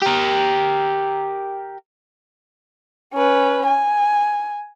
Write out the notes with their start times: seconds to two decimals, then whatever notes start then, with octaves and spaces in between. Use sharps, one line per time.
0.02 G4 A#4
3.14 C#4 B4
3.66 G#5